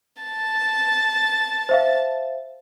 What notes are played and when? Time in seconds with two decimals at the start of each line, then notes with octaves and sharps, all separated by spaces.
0.22 A5 A6
1.69 C5 E5 F5